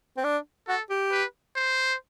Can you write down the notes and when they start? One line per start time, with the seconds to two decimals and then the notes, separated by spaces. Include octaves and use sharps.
0.17 C4
0.24 D4
0.68 F#4 A4
0.90 G4
1.12 B4
1.56 C5